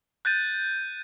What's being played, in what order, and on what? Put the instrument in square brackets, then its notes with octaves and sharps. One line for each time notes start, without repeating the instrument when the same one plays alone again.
[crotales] F#6 G6 A6 D#7